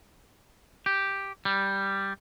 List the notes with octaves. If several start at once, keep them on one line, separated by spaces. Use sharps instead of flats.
G4
G3